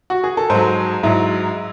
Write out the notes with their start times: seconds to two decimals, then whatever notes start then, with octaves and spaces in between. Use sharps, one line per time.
0.10 F#4
0.24 G#4
0.37 A4
0.50 G#2 F#3 C5
1.03 G#2 F#3 E4